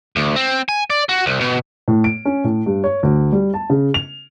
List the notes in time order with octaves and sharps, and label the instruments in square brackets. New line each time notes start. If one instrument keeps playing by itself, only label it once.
[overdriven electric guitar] D2
C4
G#5
D5
F#4
C2
B2
[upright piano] A2
D7
C#4
A2
G2
C#5
D2
G3
A5
C#3
F7